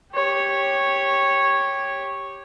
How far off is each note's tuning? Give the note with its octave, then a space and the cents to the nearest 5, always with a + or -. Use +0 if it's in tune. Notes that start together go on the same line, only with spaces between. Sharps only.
G4 +0 C#5 -10